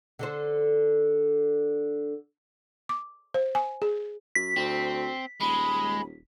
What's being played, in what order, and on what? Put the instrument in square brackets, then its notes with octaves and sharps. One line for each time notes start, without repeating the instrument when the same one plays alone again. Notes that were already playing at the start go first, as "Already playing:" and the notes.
[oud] D3 A4 C5
[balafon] D6
C5
G#5
G#4
[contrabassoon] F#2 [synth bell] B6
[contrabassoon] D2 [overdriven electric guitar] C4
[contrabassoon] D#1 [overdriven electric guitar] G#3 [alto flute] B5